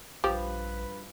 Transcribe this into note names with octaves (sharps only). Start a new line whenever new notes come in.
A#1 G2 F3 G4 B4